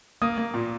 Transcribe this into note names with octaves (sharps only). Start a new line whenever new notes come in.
A#3 D#6
A#3
A#2